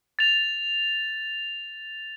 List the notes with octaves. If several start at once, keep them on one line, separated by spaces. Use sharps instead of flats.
A6 F7